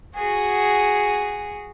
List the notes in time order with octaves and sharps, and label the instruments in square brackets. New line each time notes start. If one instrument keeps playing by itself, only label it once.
[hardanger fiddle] F#4 G#4